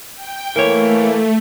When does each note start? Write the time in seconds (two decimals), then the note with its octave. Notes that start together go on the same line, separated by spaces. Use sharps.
0.15 G5
0.56 E3 A3 A#3 A#4 C#5